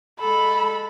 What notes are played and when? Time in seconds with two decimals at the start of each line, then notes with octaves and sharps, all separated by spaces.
0.20 G#3 A4 B5